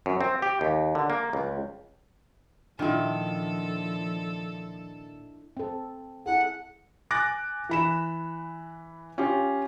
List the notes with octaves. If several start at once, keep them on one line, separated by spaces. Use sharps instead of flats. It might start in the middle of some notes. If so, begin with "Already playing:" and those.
F#2
C4
G4
D#2
D3
A#3
C#2
A#2 D#3 F3 D4 E4 A4
C4 A4
E4 G#4 A4 F#5
G#5 D6 F#6 A6 A#6
E3 B5 E7
C#4 F4 G4